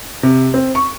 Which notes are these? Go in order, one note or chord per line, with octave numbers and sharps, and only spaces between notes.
C3
C4
C#6